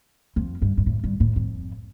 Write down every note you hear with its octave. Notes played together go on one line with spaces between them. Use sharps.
F2
G2
G2
A2
G2
A2
F2